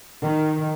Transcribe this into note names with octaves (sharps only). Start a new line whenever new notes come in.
D#3